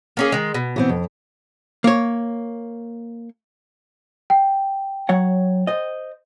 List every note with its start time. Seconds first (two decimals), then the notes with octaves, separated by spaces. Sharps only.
0.17 A#3 C#4 G#4
0.32 D#3 G#3
0.54 B2
0.76 E3 B3 C4
0.89 F2
1.84 A#3 C#5
4.30 G5
5.09 F#3 C#5 F#5
5.67 C5 D#5